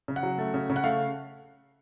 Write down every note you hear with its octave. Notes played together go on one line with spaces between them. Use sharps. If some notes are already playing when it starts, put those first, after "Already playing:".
C#3
F#5
F#3
A3
C#3
C#3
F#5
A3 F5